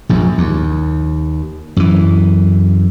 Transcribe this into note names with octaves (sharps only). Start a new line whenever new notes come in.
A#1 F#2
D#2
F#2 E3